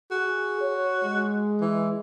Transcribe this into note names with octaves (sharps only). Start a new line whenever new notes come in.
F#4 G#4
C#5
G#3
E3